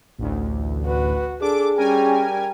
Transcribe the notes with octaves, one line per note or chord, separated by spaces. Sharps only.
A1 D2
F#4 B4
D4 G#4 A4 D6
G3 C#4 A#4 G#5